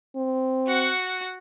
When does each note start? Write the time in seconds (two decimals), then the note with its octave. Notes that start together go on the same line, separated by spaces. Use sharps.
0.16 C4
0.67 F#4 F#5